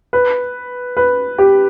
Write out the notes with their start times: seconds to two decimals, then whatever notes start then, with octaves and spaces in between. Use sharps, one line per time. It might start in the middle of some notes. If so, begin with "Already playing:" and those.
0.13 B4
0.97 B4
1.38 G4